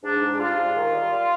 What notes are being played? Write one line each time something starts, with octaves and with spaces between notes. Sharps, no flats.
G#2 D4
G#2
G3 F4
G#2
D#3
G3
G3